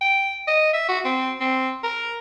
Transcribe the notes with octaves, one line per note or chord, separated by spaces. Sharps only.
G5
D#5
E5
F#4
C4
C4
A#4